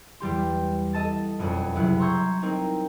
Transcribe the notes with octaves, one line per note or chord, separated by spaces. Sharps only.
E2 G3 G4 C6
A4 D#5 A5 A6
E1 F2 E3 C#4 F#5
F#1 C2 F#3 E4 F#5 F#6
A#5 C6 C#6 E6 G6 G#6
C4 D#4 A#4